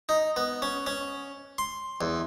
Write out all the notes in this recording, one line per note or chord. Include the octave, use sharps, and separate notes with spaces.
D#4
B3
C#4
C#4
C6
E2